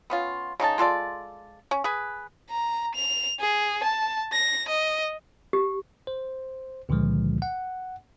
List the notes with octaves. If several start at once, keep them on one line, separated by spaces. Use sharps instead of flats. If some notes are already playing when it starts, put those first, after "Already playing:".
B3 C#4 F4
C#3 D#4 F4 A5
G#3 F4 A4 D5
C#4
G#4 B4
A#5
F7
G#4
A5
A#6
D#5
G4
C5
C#2 A#2 D3 D#3 F3 G#3
F#5